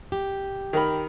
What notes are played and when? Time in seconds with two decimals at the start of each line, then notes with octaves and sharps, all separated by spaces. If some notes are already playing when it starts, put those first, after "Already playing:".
0.12 G4
0.73 D#3 A#4 B5